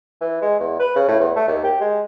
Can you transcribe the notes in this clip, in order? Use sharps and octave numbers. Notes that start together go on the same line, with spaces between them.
E3
G#3
E2
B4
C#3
A2
E2
A3
D#2
G4
G#3